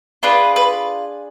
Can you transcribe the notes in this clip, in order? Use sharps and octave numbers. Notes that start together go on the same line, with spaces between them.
D4 F4 G#4 B4
B4